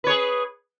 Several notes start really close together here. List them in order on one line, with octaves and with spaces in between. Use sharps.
B4 C#5 G#4